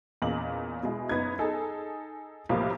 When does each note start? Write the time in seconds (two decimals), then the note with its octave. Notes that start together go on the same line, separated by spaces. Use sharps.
0.22 E2 A#2 C#4 D#5 F#7
0.83 B2 G#3 E4
1.09 F#1 B3 D#4 G#6
1.39 D#4 G#4 A4
2.49 B1 A2 C3 F3 G3 A#3